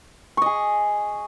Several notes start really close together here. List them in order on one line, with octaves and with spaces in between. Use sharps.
C#6 D#5 G#4